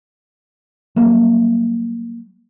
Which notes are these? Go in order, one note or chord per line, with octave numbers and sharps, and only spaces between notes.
F#3 G3 A#3